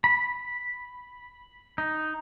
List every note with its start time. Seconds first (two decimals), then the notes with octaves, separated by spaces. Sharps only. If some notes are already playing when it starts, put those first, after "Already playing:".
0.04 B5
1.78 D#4